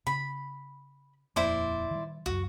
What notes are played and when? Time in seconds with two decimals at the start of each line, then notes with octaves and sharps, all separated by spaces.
0.07 C#3 B5
1.36 D#1 F2 A#3 E4 C5 D5
1.91 D#3 G3
2.26 C#2 F#2 F#4